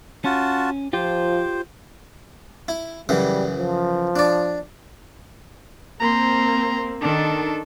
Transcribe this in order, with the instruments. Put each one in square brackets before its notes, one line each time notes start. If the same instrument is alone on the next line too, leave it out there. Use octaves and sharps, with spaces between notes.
[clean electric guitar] C#4 [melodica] F4 F#4 A5
[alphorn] F3 [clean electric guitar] F4 G4 [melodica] C5
[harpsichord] E4
[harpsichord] F#2 C#3 E3 [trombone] G3
[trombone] F3
[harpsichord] D4 D5
[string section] A#3 C4 [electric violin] A#5 C6
[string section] D#3 [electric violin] D4 A4